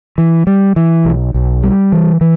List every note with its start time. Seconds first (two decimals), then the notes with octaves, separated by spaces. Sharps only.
0.18 E3
0.47 G3
0.76 E3
1.05 B1
1.34 B1
1.63 G3
1.92 E3
2.21 E3